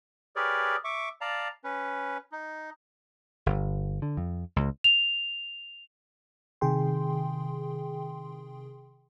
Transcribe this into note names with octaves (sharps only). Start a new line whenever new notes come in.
G4 G#4 A#4 B4 C#5 D5
E5 C#6 D6
D5 F5 A5 A#5
C#4 B4
D#4
G1
D3
F2
C#2
F7
C3 D#3 G#4 G5 C6